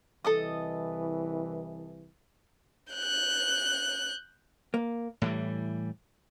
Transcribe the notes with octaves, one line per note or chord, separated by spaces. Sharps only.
C2 E3 A4 D#5 D#6
F#6 G6
A#3
A2 E3 G3